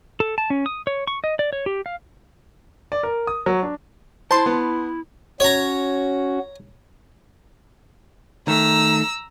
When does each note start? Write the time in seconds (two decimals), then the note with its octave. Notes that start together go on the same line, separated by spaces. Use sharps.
0.20 A4
0.38 A5
0.50 C#4
0.66 D#6
0.87 C#5
1.07 C#6
1.24 D#5
1.39 D5
1.53 C#5
1.66 G4
1.86 F5
2.92 D5
3.03 A#4
3.27 D#6
3.46 F#3
3.63 D4
4.31 E4 C5 A5 C6
4.46 B3
5.40 C#4 F#4 C#5 A#5
8.48 D#3 A3 A#5 E6